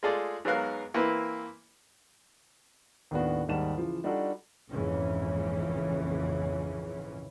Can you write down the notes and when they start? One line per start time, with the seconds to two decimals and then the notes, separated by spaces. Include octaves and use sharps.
0.03 G#3 A3 F4 G#4 A4 D5
0.45 G#2 F#3 B3 A#4 F5 F#6
0.94 E3 A#3 C4 E4 B4
3.11 D#2 A2 B3 D4 F#4
3.49 D#2 G#2 G3 F#5 A5 E7
3.78 C#3 E3 F3
4.04 G3 D4 D#4 F4 F#4 A4
4.70 A#1 F2 G#2 C#3 E3 C#4